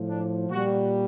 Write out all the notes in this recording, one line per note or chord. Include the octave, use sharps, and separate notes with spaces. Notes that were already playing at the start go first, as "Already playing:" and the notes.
Already playing: A2 F3
D4
A#2 G3 F#4